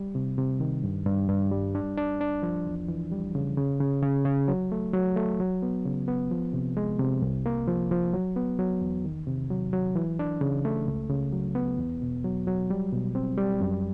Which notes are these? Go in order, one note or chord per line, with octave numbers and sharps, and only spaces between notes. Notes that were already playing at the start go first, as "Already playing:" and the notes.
Already playing: G3
C3
C3
D#3
G2
G2
G2
G3
D4
D4
D4
F3
E2
E3
G3
C#3
C#3
C#3
C#3
C#3
F#3
A3
F#3
A3
F#3
B3
C#3
B3
F3
C3
G#3
C3
C2
A#3
F3
F3
F#3
B3
F#3
E2
D#3
C3
F#3
F#3
E3
D4
C#3
A3
C#2
C#3
F#3
B3
E2
B2
F#3
F#3
G3
B2
C4
G3
F#2